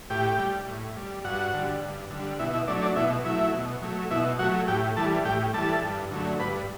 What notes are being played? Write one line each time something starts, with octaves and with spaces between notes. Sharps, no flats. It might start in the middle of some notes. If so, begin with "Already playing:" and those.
A2 G4 G5
G3
A2
G3
G2 F#4 F#5
D3 G3
G2
D3 G3
B2 E4 E5
E4 E5
F#3 A3 D4 D5
D4 D5
B2 E4 E5
F#3 A3 E4 E5
B2
F#3 A3
B2 E4 E5
F#3 A3 F#4 F#5
A2 G4 G5
E3 G3 A4 A5
A2 G4 G5
E3 G3 A4 A5
G2
D3 F#3 A3
G2 B4 B5